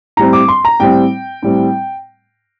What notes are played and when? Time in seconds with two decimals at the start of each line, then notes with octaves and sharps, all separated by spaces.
0.17 A2 G3 C4 A#5
0.33 D6
0.48 C6
0.65 A#5
0.80 A2 G3 C4 G5
1.43 A2 G3 C4